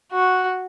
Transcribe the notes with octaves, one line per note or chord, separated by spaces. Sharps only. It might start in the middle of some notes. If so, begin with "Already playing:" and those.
F#4